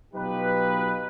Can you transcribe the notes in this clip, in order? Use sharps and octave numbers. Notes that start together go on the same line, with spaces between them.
B2 F#3 D#4 F4 G4 B4